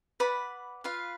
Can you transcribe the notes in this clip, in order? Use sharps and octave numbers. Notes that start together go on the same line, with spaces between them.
B4 D5 F#5 B5
F4 B4 F5